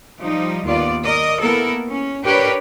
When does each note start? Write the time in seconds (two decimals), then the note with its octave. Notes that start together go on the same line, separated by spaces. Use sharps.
0.21 F3 G3 D#4
0.66 D#2 D#3 B3 F4 D5
1.05 A#4 D5 D#5
1.39 A#3 B3 E4 A4 A#4
1.90 C#4
2.24 D4 G4 A#4 B4 C#5